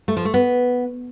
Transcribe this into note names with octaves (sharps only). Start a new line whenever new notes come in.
A3
F3
A3
B3